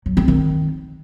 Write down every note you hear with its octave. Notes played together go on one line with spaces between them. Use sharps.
F#3
C4
D#3